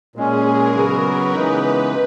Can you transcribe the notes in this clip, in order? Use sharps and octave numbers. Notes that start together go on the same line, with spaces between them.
A#2 G#3 C#4 G#4
A#4
C#3 F#3 B3 F#4
B4
C#3 E3 G#3 B3 D#4 B4